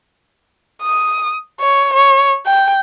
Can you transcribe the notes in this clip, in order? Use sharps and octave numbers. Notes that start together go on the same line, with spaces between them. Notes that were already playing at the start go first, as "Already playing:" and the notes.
D#6
C#5
C#5
G5